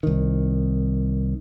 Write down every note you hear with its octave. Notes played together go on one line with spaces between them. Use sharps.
C2 D#3